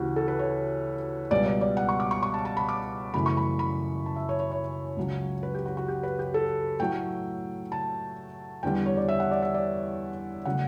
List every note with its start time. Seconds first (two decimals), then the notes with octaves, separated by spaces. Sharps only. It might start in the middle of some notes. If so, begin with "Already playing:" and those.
Already playing: D2 C#3 E3 F#4 G4
0.16 A4
0.28 B4
0.39 C#5
1.31 C#2 B2 G3 D5
1.46 D5
1.61 D5
1.77 F#5
1.89 C#6
2.00 D6
2.11 C#6
2.23 C#6
2.34 A5
2.45 A5
2.57 B5
2.69 D6
3.14 F#2 C#3 E3 A3 B5
3.26 C#6
3.37 B5
3.59 B5
4.06 A5
4.16 E5
4.29 C#5
4.40 C#5
4.52 C#5
4.97 C#2 C#3 F#3
5.43 B4
5.54 G4
5.66 F#4
5.77 F#4
5.88 G4
6.03 B4
6.19 G4
6.34 A4
6.79 A2 F#3 A3 G5
7.72 A5
8.63 E2 D3 G3 G5
8.86 C#5
8.97 D5
9.08 E5
9.20 F#5
9.31 D5
9.43 E5
9.54 D5
10.45 C#3 F#3 A3 F#5